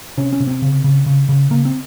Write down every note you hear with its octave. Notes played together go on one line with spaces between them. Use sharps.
C3 C#4
C#4
C3
C4
C#3
C#3
C#3
C#3
C#3 A#3
C4